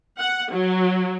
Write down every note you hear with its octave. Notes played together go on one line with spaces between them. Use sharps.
F#5
F#3